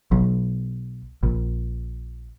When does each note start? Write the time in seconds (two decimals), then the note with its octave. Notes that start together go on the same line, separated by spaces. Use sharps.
0.12 B1
1.23 A#1